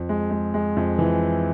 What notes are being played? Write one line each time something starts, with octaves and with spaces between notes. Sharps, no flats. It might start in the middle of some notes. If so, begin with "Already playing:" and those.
Already playing: F2
G#3
G#3
G#3
F2
E3